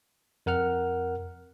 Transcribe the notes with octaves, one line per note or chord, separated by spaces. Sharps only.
F2 A#4 F#5 F6